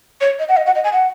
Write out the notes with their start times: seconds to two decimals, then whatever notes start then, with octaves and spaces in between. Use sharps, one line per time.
0.21 C#5
0.39 D#5
0.49 F#5
0.57 D#5
0.66 F#5
0.75 D#5
0.84 G#5
0.93 F#5